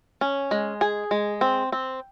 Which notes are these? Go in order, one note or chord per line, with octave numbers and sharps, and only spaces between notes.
C#4
G#3
G#4
G#3
C4
C4